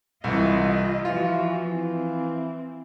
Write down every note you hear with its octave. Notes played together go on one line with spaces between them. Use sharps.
C2 C3 E3 F4 D#5
E3 F3 F4 F#4
E3 C4